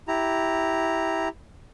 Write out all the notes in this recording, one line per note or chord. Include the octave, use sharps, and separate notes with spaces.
E4 G4 A#5